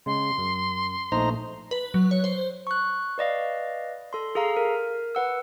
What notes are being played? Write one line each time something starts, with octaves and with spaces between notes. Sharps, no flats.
C#3 G#3 C6
F#2
A#1 A3 D#4 C5 A#5
B4
F#3
C#5
C5
C#6 F#6
B4 D5 D#5 F5
A4 C6
G#4 A4 F5 A#5
A#4
B4 F#5 E6